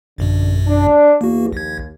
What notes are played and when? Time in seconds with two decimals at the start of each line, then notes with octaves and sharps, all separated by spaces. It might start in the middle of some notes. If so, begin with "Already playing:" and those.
0.18 A1 F#2 B2 D3
0.67 D4
1.21 E2 A#3 F#4
1.53 A#1 D#2 G#6